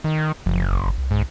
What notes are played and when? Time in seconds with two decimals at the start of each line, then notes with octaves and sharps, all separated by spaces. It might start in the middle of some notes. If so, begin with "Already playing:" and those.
0.04 D#3
0.46 F#1 F3
0.72 G#1
0.98 C2
1.11 C2 G#2